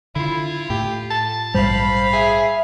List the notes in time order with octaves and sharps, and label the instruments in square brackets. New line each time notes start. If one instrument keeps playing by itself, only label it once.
[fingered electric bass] D3 [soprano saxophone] E4 [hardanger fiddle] F4
[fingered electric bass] A2 [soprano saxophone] G4
[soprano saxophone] A5
[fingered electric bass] A#1 G#2 G3 [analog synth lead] C5 [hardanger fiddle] F5 B5
[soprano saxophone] G#4 [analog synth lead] E5